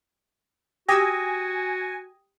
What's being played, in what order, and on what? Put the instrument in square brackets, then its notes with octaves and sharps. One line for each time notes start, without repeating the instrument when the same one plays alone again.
[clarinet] F#4 [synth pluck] G4 E6 [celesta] G5 D#6 A#6 [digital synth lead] G#5